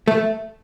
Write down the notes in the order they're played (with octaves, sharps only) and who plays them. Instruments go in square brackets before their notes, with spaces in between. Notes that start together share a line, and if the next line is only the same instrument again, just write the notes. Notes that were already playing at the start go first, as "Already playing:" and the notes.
[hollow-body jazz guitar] A3